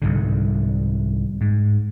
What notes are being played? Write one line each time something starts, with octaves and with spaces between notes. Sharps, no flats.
C2 G#2 D3
G#2